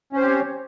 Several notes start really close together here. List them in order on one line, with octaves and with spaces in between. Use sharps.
C#4 C5 G4 C4 C#5